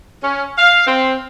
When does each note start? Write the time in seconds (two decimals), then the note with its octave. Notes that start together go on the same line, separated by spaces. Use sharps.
0.22 C#4
0.57 F5
0.87 C4